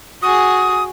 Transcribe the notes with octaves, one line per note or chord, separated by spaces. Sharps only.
F#4 G#4 D#6